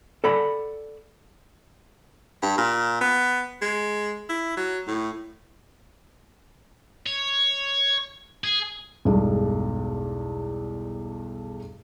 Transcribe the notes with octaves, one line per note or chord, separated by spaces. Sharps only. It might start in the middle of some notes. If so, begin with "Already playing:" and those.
A4 D5 F#5 B5
G2
A#2
B3
G#3
E4
F#3
A2
C#5
G#4
B1 E2 G2 G#3